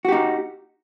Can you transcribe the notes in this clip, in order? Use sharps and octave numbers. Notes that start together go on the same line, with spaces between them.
D#4 F#4 G4